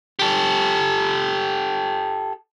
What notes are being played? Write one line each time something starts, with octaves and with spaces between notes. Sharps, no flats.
G4 A4